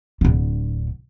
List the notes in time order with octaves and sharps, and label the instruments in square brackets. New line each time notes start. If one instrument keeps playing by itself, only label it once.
[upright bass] D1 D3